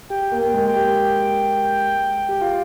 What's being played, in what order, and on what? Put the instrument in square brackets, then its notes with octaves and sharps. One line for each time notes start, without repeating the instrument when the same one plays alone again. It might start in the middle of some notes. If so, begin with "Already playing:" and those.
[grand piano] G4 [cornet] G5
[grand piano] A#3
[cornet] G5
[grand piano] A#3
G#3
[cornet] G5
[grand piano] G4
G4
F4